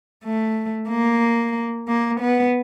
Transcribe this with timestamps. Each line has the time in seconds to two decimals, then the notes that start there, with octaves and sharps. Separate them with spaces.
0.24 A3
0.89 A#3
1.88 A#3
2.21 B3